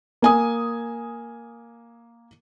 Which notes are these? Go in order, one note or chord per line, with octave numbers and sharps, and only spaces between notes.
A#3 G#5 D#6